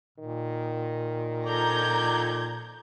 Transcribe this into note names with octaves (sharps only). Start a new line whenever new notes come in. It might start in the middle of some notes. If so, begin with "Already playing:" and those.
A#2 D#3
F3 A4 D5 A#5 G6 G#6